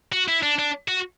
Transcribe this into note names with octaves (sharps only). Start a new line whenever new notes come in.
F#4
E4
D4
D4
F#4